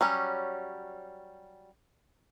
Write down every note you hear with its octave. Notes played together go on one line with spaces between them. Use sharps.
F#3 G3 C#4